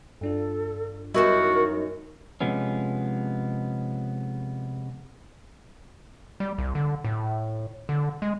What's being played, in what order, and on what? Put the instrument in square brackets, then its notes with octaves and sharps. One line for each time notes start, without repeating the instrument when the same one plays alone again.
[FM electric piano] G2 D4 F4 [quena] A4
[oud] F#2 D#3 E4 [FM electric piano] G3 B3 D#5 [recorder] F#4 [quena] A#4
[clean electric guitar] C3 F3 G#3 B3 C#4
[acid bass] G3
C2
D3
A2
D3
G#3